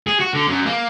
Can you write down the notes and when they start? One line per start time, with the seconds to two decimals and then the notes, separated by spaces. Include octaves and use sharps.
0.07 G#4
0.20 F#4
0.34 D3
0.47 F#2
0.66 A#3